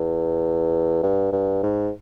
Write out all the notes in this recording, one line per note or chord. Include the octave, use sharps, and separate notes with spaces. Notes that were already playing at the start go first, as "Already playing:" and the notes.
Already playing: E2
G2
G2
G#2